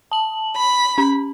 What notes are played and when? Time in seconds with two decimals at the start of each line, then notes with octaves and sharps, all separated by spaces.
0.11 A5 F#7
0.57 B5
0.98 C#4